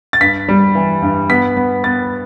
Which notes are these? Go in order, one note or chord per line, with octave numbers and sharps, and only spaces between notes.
A6
G2 B6
G3
E3
G2
B3 B6
B3
B3 A6